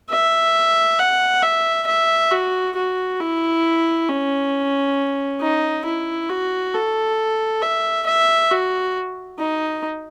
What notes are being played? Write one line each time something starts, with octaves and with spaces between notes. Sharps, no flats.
E5
F#5
E5
E5
F#4
F#4
E4
C#4
D#4
E4
F#4
A4
E5
E5
F#4
D#4